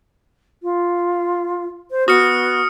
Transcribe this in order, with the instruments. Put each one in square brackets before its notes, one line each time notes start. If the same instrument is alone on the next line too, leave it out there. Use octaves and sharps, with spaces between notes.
[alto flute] F4
C5
[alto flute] B3 [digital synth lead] F#4 [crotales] D#6 F6 C#7